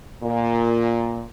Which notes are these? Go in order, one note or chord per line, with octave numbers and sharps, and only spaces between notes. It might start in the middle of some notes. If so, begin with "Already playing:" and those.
A#2